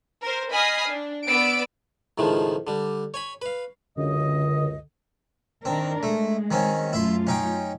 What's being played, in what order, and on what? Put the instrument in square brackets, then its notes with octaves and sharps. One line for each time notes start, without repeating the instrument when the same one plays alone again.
[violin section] A#4 C5
D#5 G#5 B5 D#6 F6 C7
D4
B3 D5 E6 D7
[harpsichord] C#2 A2 D#3 F3 G#3
D3 G3
C#5 G#5 B5
B4 F5
[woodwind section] C#2 F#2 D#5 [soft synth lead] D3
[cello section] D#3 D4 A#4 [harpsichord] C4
[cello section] G#3 [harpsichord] A3
[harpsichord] D#3 C4 C#4
[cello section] F#2 A3 F4 [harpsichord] E4 C6
[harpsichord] C#4 D#4 G5